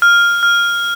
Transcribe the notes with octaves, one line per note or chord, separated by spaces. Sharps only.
F6
F6